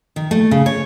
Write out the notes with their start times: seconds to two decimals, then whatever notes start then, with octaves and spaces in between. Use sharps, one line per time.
0.16 D#3
0.31 A3
0.51 C#3
0.66 C#5